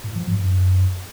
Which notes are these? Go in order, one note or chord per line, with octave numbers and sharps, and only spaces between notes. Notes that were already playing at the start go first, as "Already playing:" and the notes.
A2
F3
G#2
F#2